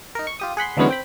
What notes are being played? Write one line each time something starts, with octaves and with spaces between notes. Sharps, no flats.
D#4 A#4
C#6
F4 G4 D#6
G#4 F#5 B5 C6
D3 E3 F#3 G#3 B3 C#4
C4 G5 B5